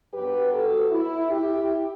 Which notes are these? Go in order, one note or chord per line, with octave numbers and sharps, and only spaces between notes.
G2 F#3 B3 G4 B4
F#4 A4
E4
E4 G4